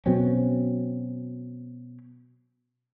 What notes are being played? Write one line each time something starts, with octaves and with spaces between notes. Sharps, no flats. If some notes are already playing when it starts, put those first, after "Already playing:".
B2 F#3 C4 C#4